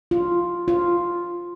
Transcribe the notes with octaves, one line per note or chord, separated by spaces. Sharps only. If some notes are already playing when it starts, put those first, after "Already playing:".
F4
F4